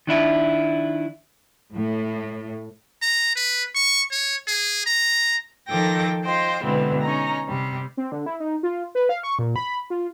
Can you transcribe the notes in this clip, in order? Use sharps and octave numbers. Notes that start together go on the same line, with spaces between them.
D#3 D4 E4 F4
A2
A#5
B4
C#6
C#5
G#4
A#5
D#3 F3 A4 G5 D6 A#6
F4 C5 D#5 G5
B2 D3 E3 G#3 B3 C4
C#4 D#4 A#5
C3 G3
C4
D3
E4
D#4
F4
B4
F5
C#6
A#2
B5
F4